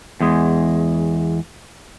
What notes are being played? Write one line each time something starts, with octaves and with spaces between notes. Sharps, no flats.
E2 G#3